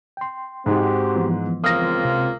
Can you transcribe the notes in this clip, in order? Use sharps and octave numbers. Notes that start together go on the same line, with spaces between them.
G5 C6
G#2 G#3 C4 F#4 G4
E3 F3 B3
C#2 A#3 C4 F4 D#6 A#6
C3